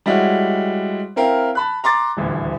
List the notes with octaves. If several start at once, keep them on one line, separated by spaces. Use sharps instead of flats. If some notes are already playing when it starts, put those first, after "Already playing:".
G3 G#3 E4 F#4 C#5
C4 E4 A#4 F5 G5
A5 B5 F#6
A#5 C6 D6 A6
D#1 A1 D2